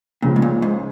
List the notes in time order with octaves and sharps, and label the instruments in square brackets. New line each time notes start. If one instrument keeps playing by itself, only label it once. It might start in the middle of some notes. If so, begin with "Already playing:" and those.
[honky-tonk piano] C#2 C#3 F3 [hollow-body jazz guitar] A#2
[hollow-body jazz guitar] G#2
A#2
G#2